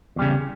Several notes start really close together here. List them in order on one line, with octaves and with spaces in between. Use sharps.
E2 G3 C#3